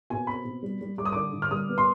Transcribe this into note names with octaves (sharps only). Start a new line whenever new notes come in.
B2 G#5
C4 B5
B2
G3
G3
G3 D6
D#6
D3 D6
D3
F6
G3 D#6
B3
C6